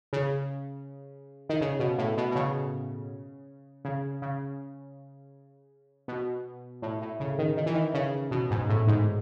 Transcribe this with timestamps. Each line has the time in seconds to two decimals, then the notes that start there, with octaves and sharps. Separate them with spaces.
0.13 C#3
1.49 D#3
1.61 C#3
1.79 B2
1.98 A2
2.17 B2
2.31 B2
2.36 C#3
3.85 C#3
4.22 C#3
6.08 B2
6.82 A2
7.02 A2
7.20 C#3
7.39 D#3
7.57 D#3
7.66 E3
7.74 D#3
7.94 C#3
8.31 B2
8.51 G#2
8.69 A2
8.88 G#2